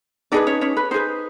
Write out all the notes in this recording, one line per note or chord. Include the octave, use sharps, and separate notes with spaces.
D4 D#4 G#4 B4 D5
C#4 C#5
C#4 C#5
B4
D#4 G#4 B4 C5